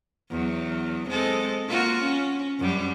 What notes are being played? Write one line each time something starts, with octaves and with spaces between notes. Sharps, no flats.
E2 F#3
G#3 C4 A4
A#3 F4 F#4
C#4
F#2 G3